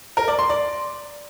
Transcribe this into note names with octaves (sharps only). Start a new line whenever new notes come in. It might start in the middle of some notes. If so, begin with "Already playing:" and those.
A#4
D5
C6
D5